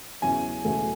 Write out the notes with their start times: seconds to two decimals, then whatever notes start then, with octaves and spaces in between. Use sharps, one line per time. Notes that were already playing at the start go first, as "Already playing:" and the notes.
0.22 E2 C#3 F#3 C#4 E4 G#5
0.64 E1 E2 C#3 F#3 A3